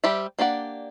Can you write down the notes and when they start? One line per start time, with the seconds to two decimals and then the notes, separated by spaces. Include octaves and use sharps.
0.04 G3 G4 C5 E5
0.39 A#3 D4 G4 D5 F#5